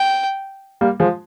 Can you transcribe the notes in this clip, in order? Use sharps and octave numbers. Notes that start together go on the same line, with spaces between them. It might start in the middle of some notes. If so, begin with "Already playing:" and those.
Already playing: G5
G3 A#3
F3 G#3